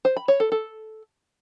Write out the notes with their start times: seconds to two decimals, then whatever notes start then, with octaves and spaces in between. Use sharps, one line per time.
0.05 C5
0.17 B5
0.28 C#5
0.40 A4
0.52 A4